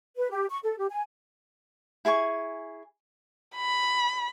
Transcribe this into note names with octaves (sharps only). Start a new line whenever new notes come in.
B4
G4
C#6
A4
G4
G#5
E4 G#4 G#5 C#6
B5